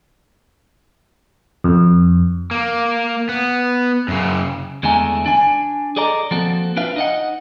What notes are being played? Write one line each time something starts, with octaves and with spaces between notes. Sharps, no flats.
F2
A#3
B3
F#2 C#3
E2 D3 G#3 A3 G#5 A#5
D4 G#5
G#4 A4 D5 D#5 A#5
F3 A#3 C4 F#4 A4
D4 F4 B4 E5 F5
D#4 D#5 F#5